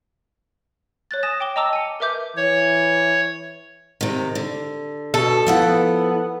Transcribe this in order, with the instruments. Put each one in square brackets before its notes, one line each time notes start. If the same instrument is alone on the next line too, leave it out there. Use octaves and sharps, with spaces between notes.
[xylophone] C#5 F#6 A6
G#5 D#6 A#6 E7
G5 D6 G7
D#5 A5 A#5 D6 E6
G#5 C#7
A#4 B4 E5 D6 G6
[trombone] E3 [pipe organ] C#5
[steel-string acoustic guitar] C3 D#3
D3
[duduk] B2 [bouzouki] A4
[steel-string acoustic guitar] F3 E4 F#5 [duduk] B3
[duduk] B3